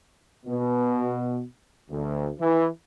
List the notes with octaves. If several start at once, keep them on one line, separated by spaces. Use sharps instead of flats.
B2
D2
E3